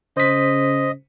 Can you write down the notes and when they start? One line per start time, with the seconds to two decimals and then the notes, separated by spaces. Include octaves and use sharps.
0.17 C#3 C5 D#5 B6